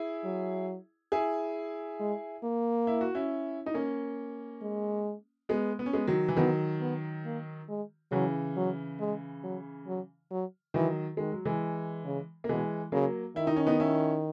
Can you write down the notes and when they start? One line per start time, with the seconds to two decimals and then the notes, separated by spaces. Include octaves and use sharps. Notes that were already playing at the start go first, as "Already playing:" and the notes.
Already playing: E4 G#4
0.24 F#3
1.12 E4 G#4
2.00 G#3
2.43 A#3
2.87 E4
3.01 F#4
3.15 C#4 E4
3.66 D#4
3.74 A#3 C#4
4.62 G#3
5.49 G#3 B3
5.79 B3
5.86 C#4
5.93 G#3 B3
6.07 D#3 F#3
6.28 E3
6.37 D#3 F#3 B3
6.81 B3
7.25 A#3
7.69 G#3
8.12 C#3 E3 F#3
8.56 F#3
9.00 G#3
9.43 F#3
9.87 F#3
10.31 F#3
10.74 D#3 E3 F#3
11.17 D#3 G#3
11.32 F#3
11.45 E3 G#3
12.05 C#3
12.44 A#3
12.49 B2 E3 G#3
12.92 C#3 F#3 A#3
13.36 D#3 E4
13.47 D#4
13.56 C#4
13.67 B3 D#4
13.80 C#4 E4